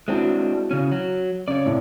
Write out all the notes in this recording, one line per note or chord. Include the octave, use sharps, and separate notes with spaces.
G#3 C4 D4 E4 F#4
C#3 C#4
F#3
C#3 C#5 D5
A2 C3